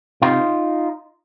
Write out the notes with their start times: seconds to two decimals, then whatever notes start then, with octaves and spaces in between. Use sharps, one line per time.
0.22 C3 D#4 F4